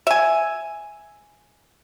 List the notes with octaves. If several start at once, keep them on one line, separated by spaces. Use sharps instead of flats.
E5 G#5